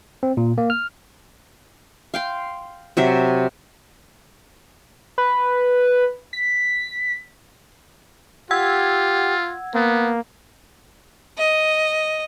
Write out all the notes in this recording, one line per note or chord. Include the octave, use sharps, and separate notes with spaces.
C4
A#2
A#3
F6
F5 G5 C6
C3 F#3 E5
B4
B6
F4 G4 F#5 E6 G#6
A#3 B3
D#5